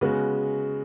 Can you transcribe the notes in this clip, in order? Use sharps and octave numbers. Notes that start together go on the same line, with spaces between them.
C#3 G#3 B3 F#4